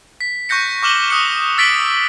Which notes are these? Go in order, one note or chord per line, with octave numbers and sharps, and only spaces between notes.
B6
C#6 F#6 G6 A#6 C#7
C#6 D6 F6 E7 F#7 G7
D#6 F#6 C#7
E6 A6 B6 D7 F#7 G7